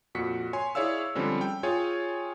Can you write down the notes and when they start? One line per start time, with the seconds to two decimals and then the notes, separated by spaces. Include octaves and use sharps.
0.15 F2 A#2 F#4 B6 C#7
0.53 C#5 G#5 C6
0.75 E4 G#4 C#5 D5 F5 E6
1.15 D3 F3 G3 G#3 C4 C#4
1.41 G5
1.63 F4 G#4 C#5 G5 G#5